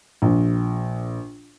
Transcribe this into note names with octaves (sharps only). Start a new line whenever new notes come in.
A#1